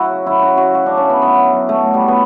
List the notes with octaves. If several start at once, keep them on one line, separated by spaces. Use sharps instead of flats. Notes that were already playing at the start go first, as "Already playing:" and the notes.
Already playing: F#3 E4 F#4
C#3
F#3 E4
C#3 F#4
C#3 F#4
C#3 F#4
F#3 D4
C#4
F#3 B3
F#3 B3
F#3
F#3
F#3 A3
F#3
G3
F#3
B3